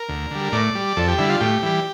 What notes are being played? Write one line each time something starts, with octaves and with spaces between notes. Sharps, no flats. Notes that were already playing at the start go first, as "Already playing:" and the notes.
Already playing: A#4
D2
D3 G3
A2 D5
G3
F2 A4
G4
D3 G3 E4
F4
A2 G4
E3 G3